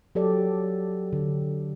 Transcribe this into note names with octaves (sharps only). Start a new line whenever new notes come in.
F#3 G4 A4 D5
D3